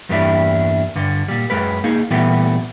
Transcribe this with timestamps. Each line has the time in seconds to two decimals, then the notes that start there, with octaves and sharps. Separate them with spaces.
0.09 E2 G2 G3 A#3 D4 E4
0.96 G2 D3
1.28 A#2 G3
1.50 F#2 G#3 A#4 B4
1.84 A#3 D#4 G#4
2.11 A#2 E3 G3 A3 B3